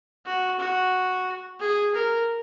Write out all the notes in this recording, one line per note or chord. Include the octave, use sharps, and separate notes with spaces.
F#4
F#4
G#4
A#4